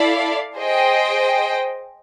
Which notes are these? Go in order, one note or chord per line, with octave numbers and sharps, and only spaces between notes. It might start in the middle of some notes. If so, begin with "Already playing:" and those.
Already playing: E4 A4 D5 F5
G#4 C5 D#5 G5